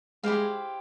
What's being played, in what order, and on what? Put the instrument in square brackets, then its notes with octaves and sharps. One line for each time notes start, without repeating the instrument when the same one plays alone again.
[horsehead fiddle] G#3 [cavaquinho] E4 G4 C5 F5